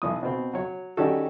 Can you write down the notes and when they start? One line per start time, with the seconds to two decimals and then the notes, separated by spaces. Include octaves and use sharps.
0.02 B1 E3 D#6
0.23 B2 C4
0.53 F#3 C#5
0.97 D#3 G3 C#4 D#4 F#4 A4